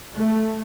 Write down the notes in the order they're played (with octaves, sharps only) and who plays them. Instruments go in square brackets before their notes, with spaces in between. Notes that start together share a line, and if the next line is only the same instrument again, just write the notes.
[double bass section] A3